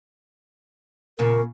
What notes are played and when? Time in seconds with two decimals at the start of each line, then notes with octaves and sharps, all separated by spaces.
1.19 E2 A#2 C#3 A#4